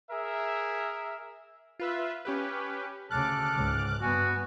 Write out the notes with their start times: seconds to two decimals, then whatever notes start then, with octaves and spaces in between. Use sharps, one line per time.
0.11 G#4 A#4 E5
1.79 F4 B4 E5
2.25 C#4 G4 B4
3.11 D2 C#3 A4 D6 F6 F#6
3.55 C#2 G#2
4.01 G2 B3 F#4 G#5